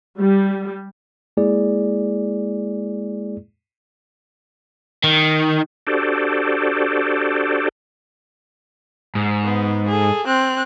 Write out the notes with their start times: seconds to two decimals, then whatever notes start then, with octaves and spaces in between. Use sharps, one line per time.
0.18 G3
1.37 G#3 A#3 E4 G#4 D5
5.04 D#3
5.87 D4 F#4 G4 A4 C5 D5
9.15 G#2
9.45 B3
9.88 G#4 A4
10.27 C4 F#6